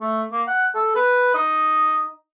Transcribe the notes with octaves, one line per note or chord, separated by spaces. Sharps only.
A3
A#3
F#5
A4
B4
D#4